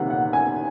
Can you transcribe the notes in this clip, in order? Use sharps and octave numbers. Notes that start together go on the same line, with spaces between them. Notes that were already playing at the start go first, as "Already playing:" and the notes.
Already playing: C3 D#3 G3 A#3 F#5
F#5
G#5